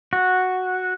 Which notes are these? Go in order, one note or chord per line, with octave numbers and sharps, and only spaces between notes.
F#4